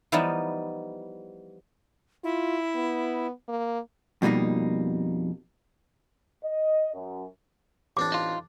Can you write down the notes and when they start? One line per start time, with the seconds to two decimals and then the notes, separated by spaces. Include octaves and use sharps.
0.12 E3 F3 G3 B3 D#4 E4
2.24 E4 F4
2.75 B3
3.49 A#3
4.22 F2 B2 G3 A#3 D#4
6.43 D#5
6.94 F#2
7.97 A1 C4 D4 D6
8.12 D#4 F4